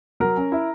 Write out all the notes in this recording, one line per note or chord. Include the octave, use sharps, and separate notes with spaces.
F#3 A#4
C#4
E4